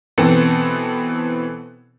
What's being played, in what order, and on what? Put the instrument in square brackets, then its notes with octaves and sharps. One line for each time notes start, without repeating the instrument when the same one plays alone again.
[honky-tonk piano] B2 E3 B3 C4 A4